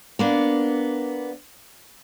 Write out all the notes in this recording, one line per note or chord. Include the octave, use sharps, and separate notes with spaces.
A#3 B3 D4